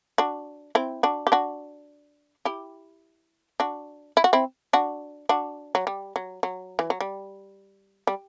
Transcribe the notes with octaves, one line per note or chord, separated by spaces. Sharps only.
D4 F#4
C4 E4
D4 F#4
G4
D4 F#4
E4 G4
D4 F#4
E4
F#4
C4 E4
D4 F#4
D4 F#4
F#3
G3
F#3
F#3
E3
F#3
G3
G3